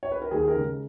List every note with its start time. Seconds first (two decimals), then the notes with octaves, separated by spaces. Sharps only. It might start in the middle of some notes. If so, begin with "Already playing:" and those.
0.03 C#5
0.12 B4
0.22 A#4
0.31 D#2 G#4
0.48 A#4
0.56 C#3 G#3